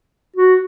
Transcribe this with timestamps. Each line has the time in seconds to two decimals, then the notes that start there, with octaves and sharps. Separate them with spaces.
0.36 F#4